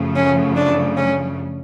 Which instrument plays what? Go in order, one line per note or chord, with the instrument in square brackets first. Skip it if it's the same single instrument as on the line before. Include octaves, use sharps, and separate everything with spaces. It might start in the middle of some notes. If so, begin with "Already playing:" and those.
Already playing: [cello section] F#2 C#3 F3 A3
[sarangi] C#4
D4
C#4